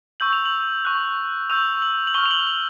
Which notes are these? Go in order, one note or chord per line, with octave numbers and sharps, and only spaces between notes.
C#6 E6 G6 F#7
F7
F#7
C#6 F#6
C#6 E6 G6 F7
F#7
F#7
C#6 F6 G7
F7
F#7
F#7